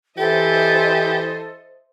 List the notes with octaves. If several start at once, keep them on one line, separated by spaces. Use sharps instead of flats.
E3 G4 A4 C5 D#5 E5